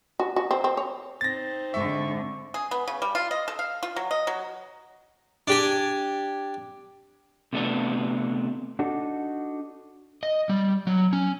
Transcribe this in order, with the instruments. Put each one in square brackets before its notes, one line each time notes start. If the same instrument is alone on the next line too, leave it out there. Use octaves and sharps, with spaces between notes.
[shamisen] F#4
F#4
C4
C4
C#5
[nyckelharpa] C4 D#4 [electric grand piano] A6 A#6
[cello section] G#2 D3 [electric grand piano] E5 [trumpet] C#6
[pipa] G#4
B3
C#3
G3
F4
D#5
A4
F5
F4
F#3
D#5
F#3
[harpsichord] D4 G4 G#5
[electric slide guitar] C3 A3 B3 D4
[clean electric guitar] D4 D#4 F#4 A4
[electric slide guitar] D#5
G3
F#3
C#4